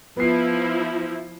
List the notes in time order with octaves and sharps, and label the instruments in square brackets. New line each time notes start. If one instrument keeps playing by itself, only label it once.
[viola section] F3 E4 [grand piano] B3 C7